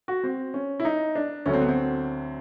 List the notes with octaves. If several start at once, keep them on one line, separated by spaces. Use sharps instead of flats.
F#4
C4
C#4
E4
D#4
D4
D2 D3 F#3 C#4
C4
B3
C4